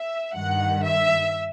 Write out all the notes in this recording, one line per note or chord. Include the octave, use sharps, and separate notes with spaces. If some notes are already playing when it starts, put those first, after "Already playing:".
Already playing: E5
G2 D#3 F#5
E5